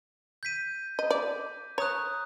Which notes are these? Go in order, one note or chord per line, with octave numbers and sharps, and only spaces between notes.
G6 B6 D#7
D#5
D5
C#5 A#5 D#6 F#6